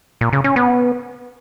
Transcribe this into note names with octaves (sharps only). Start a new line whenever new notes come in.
A#2
C#3
C#4
B3